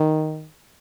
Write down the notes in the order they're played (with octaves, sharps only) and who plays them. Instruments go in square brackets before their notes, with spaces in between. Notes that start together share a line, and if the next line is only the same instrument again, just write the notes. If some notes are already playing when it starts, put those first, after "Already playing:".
Already playing: [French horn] D#3